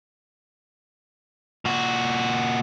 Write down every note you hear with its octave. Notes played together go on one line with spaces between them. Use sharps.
A#2 F#4